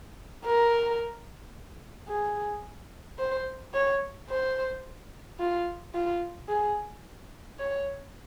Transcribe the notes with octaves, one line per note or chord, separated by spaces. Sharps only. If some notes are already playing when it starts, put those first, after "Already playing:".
A#4
G#4
C5
C#5
C5
F4
F4
G#4
C#5